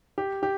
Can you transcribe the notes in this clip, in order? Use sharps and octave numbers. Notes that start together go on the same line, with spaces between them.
G4
G4